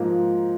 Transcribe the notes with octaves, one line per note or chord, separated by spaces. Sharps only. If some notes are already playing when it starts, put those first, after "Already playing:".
Already playing: G#2 F3 A#3